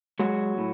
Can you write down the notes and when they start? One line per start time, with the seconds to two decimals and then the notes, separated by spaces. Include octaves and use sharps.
0.19 F#3 G#3 F#4
0.58 A2